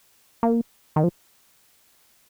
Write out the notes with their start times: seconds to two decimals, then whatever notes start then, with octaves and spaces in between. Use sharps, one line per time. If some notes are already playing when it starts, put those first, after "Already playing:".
0.43 A#3
0.96 D#3
1.04 F3